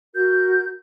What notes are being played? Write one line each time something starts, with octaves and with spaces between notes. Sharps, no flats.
F#4 A#4 G6